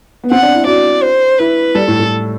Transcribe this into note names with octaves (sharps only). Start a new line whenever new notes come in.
B3
C4 F#5
D4
E4
F#4 D5
C5
E4 B4
G3 A4
A2
A2